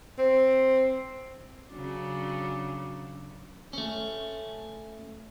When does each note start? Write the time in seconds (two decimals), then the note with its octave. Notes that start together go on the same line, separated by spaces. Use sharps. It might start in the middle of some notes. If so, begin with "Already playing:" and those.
0.18 C4
1.71 C#3 F#3 D4
3.73 A3 C#4